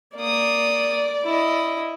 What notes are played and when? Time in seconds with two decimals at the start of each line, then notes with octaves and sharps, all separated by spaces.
0.17 A#3 D5 D#6
1.24 E4 D#5